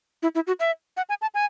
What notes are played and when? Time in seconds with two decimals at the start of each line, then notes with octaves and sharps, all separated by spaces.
0.23 E4
0.35 E4
0.47 F#4
0.60 E5
0.97 F#5
1.09 G#5
1.22 A5
1.34 G#5